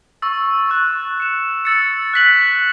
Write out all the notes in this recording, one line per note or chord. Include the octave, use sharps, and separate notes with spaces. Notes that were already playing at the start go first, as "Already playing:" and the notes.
C#6 E6 A6
C#6 F#6 A6 E7
F#6 C#7 E7
E6 A6 C#7
F#6 B6 F#7